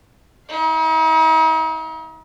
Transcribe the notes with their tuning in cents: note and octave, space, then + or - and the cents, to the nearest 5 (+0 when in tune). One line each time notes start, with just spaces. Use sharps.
D#4 +45 F5 +0